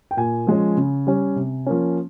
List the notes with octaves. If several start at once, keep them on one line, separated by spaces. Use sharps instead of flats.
G5
A#2 G#5
F3 G#3 C#4
C#3
G3 C#4
C3
F3 A#3 C#4